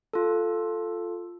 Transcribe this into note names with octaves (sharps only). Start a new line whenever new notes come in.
F4 A4